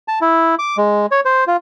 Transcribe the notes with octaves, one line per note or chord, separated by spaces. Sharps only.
A5
E4
D6
G#3
C#5
C5
F4